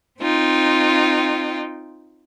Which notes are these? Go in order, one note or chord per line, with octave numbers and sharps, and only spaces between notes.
C4 D#4 F4 G5